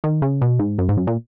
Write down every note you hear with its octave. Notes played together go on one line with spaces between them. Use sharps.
D#3
C#3
B2
G#2
F#2
G#2
F#2
A#2